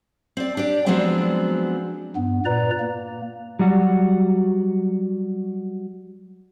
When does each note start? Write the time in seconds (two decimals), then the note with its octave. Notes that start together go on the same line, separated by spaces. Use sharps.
0.37 C4 D5
0.57 D4 G4 D5
0.86 F3 F#3 G#3 B3 C4 D4
2.16 G2 B3
2.45 A#2 B4 D5 A#5
2.80 A#3
3.59 F#3 G3 F#4